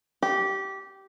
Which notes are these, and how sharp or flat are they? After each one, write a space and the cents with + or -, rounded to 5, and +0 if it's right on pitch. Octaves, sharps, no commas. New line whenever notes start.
G4 -15